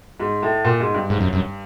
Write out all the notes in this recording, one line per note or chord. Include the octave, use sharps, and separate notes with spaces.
G#2
A2
A#2
G#2
G2
G#2
F#2
F#2